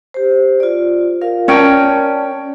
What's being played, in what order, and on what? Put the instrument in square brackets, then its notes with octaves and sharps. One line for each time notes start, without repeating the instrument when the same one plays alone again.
[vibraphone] G4 C5
F4 D5
F4 A#4 F5
[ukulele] C#4 A#4 G5 [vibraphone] D5 A5